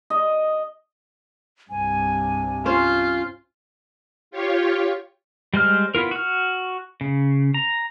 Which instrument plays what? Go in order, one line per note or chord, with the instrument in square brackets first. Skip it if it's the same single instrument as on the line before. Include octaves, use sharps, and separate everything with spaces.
[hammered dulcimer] D#5
[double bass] C2 G2 [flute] G#5
[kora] C#4 C5 [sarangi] F4
[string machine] F4 G4 C#5
[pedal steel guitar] G3 G#3 C5 F6
B3 E4 F4 A#4
F#4 F6
C#3
A#5